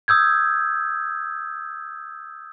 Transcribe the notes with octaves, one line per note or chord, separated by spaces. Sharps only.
D#6 E6 G6 G#6